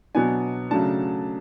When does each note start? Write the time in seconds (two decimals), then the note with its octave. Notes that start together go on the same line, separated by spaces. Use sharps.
0.15 B2 F#3 B3 D4 G#5
0.71 C#3 F#3 A3 D4 A5